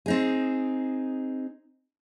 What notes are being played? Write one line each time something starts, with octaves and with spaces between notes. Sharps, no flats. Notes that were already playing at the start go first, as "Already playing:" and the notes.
C4 D#4 G#4